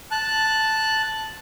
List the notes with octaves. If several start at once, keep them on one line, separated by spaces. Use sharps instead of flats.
A5 F#6